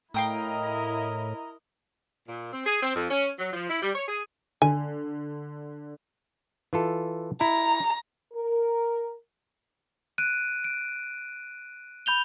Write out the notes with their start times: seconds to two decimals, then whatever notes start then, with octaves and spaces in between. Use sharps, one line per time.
0.14 A2 E4 A#4 D#5 F5 G5 A#5 D#6
2.29 A#2
2.53 C4
2.66 G#4
2.83 C4
2.96 F2
3.11 C#4
3.39 F#3
3.53 F3
3.69 E4
3.82 G3
3.95 C#5
4.08 G#4
4.62 D3 G#5
6.73 E3 F4 A4
7.41 E4 A#5
8.34 A#4
10.18 F#6 D7 D#7
10.64 D7
12.06 B5 G6 F7 G7